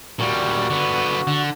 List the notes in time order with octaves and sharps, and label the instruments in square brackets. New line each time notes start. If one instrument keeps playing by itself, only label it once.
[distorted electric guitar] A#2 G3 [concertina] F#4
[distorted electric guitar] D3 B3
D3